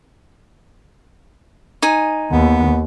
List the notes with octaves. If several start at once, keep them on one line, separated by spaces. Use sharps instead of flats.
D#4 G#5
D#2 B3